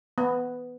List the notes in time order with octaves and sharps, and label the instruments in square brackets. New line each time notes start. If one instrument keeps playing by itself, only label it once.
[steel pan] B3